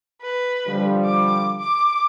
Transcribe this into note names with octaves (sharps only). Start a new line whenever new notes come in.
B4
D3 F3 G3
D6
D6